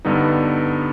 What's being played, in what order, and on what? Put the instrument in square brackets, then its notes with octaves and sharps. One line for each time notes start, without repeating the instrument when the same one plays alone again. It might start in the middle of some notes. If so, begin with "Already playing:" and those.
[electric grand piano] G2 D3 G3 B3 D#4